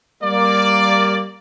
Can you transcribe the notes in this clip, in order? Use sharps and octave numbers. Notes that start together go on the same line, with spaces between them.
G3 A#3 D5